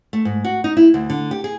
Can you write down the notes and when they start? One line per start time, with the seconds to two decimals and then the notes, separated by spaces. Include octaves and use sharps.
0.13 A3
0.25 G#2
0.45 F#4
0.64 D#4
0.77 E4
0.94 D2
1.10 D3
1.31 G4
1.44 G#4